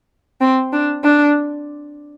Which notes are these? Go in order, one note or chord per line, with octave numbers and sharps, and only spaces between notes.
C4
D4
D4